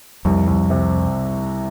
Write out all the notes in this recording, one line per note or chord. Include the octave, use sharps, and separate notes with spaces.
C2 F2
C2
C3